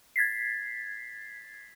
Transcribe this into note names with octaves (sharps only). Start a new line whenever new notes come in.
G#6 A6 B6 C7